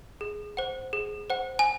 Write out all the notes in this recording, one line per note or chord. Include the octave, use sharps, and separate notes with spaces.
G#4
C5 F#5
G#4
C5 F#5
G#5